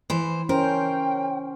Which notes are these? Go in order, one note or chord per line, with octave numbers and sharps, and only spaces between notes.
E3 C5
C#4 A#4 C5 G5